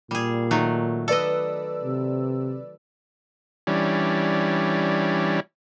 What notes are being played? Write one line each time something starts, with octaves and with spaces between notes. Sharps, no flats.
A#2 G3 G#4
D#3 F#3 A3
A4 B4 D5 D#5 E6
C3
E3 G3 C#4 D4